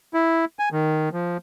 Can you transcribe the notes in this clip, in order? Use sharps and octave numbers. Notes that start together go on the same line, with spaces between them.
E4
G#5
D#3
F3